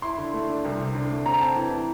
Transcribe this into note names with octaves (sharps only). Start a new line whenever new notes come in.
E4 C6
D3
A3
D4
C2
C3
D3
A3
C4 A#5
C4 A5
E3